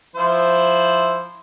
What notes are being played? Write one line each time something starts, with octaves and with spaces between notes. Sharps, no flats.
F3 E4 C5